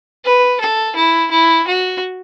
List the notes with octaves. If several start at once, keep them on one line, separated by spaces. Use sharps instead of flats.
B4
A4
E4
E4
F#4